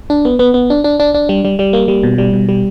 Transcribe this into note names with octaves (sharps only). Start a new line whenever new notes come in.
D4
B3
B3
B3
D4
D4
D4
D4
G3
G3
G3
A#3
G3
B2
G3
B2
G3